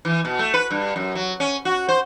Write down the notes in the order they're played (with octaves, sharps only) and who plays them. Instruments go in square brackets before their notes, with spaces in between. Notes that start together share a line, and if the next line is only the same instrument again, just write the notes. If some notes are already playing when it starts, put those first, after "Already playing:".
[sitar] E3
B2
A3
B4
G2
F#2
F#3
C#4
F#4
C5